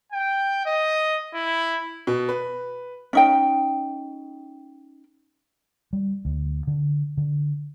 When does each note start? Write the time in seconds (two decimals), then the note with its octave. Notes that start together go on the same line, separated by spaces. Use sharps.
0.12 G5
0.66 D#5
1.34 E4
2.07 B2
2.29 B4
3.13 C#4 D#4 G5
5.93 G3
6.25 D2
6.67 D3
7.17 D3